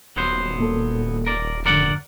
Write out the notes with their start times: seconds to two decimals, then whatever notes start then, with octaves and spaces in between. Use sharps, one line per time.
0.17 D#1 F#3 B3 C5
0.59 A#2 A#3 A4
1.26 A#4 D5
1.66 F2 G#2 D3 A#4 D5 F#5